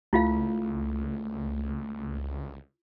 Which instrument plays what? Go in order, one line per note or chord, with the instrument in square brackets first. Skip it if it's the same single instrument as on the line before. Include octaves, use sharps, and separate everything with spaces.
[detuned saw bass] C#2 [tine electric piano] A3 [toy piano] E4 F4 F5